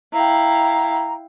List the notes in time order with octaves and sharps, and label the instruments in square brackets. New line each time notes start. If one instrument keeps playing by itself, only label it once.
[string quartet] E4 F5 G5 [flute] A#5